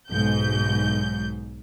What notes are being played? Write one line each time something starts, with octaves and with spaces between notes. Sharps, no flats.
B1 G#2 G6